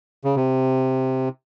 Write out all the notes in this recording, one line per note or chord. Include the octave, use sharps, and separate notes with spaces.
C#3
C3